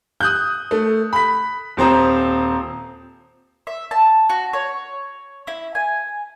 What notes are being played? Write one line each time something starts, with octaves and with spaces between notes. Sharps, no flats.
D#6 F#6 G6
A3
B5 B6
D#1 C4 C5 A#5 D#6
E5
A5
F#4
C#5
E4
G#5